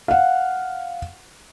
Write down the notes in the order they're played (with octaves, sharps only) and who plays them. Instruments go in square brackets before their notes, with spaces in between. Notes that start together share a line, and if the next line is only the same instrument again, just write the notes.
[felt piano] F5 F#5